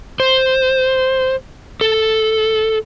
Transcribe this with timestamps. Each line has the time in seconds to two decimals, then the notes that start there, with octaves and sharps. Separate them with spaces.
0.20 C5
1.81 A4